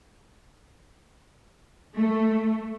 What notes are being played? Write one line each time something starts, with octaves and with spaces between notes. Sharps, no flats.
A3